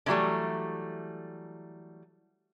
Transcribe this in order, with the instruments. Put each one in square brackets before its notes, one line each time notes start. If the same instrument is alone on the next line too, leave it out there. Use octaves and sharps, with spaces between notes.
[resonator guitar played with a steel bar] D3 E3 F#3 G3 A3